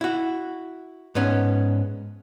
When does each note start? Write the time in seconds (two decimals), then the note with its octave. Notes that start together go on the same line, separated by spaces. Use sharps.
0.01 E4 F#4
1.15 G#2 B3 C#4